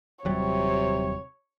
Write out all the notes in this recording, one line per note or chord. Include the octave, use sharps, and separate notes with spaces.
D#1 C3 F#3 G3 C#5